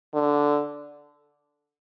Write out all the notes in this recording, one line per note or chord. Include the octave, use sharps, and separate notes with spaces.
D3